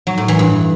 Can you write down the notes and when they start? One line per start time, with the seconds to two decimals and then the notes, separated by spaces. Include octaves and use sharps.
0.07 F#3
0.18 A2
0.28 E3
0.39 G2